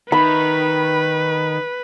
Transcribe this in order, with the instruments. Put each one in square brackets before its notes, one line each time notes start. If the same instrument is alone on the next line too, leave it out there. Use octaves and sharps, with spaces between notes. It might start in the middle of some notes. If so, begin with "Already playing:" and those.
[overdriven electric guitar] D#3 [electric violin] B4 [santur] B5